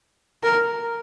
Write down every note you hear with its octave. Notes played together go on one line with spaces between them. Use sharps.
A#4